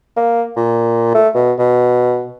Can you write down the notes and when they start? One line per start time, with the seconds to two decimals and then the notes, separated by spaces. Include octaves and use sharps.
0.17 A#3
0.56 A#2
1.14 A3
1.35 B2
1.58 B2